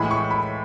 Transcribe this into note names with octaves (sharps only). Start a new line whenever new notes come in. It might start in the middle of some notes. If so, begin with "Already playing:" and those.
Already playing: A2 E3 G#3 B5
C#6
B5